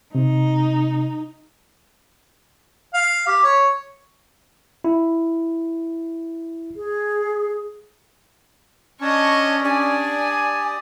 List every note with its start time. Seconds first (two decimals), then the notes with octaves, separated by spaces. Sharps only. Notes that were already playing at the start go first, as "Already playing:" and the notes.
0.15 C3 D#4
2.94 F5
3.27 G4
3.44 C#5
4.84 E4
6.76 G#4
9.01 C#4 D4 C#5 D#5 A5 C#6
9.64 D4 G4 D5 G#5 D#6